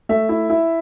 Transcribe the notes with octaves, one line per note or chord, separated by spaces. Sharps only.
A3 E5
E4
E4